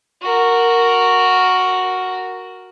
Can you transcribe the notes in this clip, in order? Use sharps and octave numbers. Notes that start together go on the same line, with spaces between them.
F#4 A#4